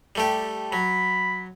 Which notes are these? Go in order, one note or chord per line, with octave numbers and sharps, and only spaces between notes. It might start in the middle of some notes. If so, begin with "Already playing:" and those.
G3 A3 G4
F#3 B5